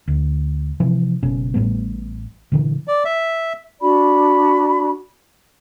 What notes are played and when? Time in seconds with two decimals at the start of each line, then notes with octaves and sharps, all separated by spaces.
0.08 D2
0.80 C3 E3 F3
1.23 F#1 B2 C#4
1.54 A1 A2 G3 B3
2.52 A#2 D3 E3
2.88 D5
3.05 E5
3.81 D4 F#4 D5 B5